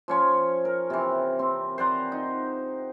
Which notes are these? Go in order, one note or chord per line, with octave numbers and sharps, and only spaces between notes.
F3 C#4 C#5
A#4
C3 E3
C4
C5 D5 F#5 A#5
D#4